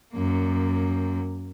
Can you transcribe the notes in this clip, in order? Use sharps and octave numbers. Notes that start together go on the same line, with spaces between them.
F#2 A#3